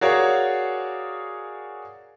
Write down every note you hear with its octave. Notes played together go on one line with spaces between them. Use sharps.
F#4 G#4 A#4 C#5 D5 F5